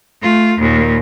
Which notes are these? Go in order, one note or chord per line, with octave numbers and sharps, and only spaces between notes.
A3 F4
D#2 A#2